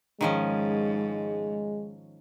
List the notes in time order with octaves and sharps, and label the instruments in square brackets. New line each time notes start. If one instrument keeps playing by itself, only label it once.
[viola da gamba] G#2 [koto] D#3 F3 C#4 [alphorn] G#3